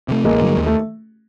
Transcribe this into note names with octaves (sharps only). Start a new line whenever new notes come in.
C3 E3 A3
A1 G#3 A#3
G2 D3 F#3
D#2
A3